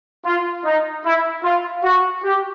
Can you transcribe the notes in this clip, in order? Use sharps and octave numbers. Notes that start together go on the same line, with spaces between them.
F4
D#4
E4
F4
F#4
G4